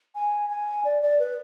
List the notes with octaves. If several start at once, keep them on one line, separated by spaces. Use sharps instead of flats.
G#5
G#5
D5
D5
B4